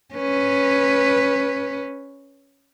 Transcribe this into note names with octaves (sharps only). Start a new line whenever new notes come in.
C#4 B4